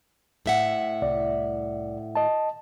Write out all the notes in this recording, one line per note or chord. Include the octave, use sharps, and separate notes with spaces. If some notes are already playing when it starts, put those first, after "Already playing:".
A2 E5 F#5
C2 D5
D#5 A5